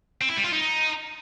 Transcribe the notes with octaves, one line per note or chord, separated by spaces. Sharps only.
C4
E4
G3
F4
D#4